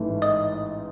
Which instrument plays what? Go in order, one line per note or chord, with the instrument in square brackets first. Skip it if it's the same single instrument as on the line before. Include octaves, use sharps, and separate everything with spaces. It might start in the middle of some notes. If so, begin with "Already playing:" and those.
Already playing: [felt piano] A1 G#2 E3 A3
[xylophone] D#5 D#6